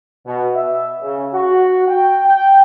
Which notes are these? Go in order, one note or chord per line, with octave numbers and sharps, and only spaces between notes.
B2
E5
C#3
F#4
G5
G5